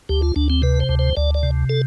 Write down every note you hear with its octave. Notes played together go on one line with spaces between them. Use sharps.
D2 G4
F4
D2 D4
C4
C3 B4
C5
D2
C5
D2 D5
D5
C3
A4